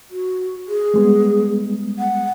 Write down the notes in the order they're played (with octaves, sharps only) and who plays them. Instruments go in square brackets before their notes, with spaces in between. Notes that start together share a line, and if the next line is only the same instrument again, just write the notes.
[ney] F#4
G#4
[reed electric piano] G3 G#3 B3
[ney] F#5